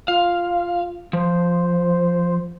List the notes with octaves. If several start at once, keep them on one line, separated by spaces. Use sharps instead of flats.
F4 F5
F3 C5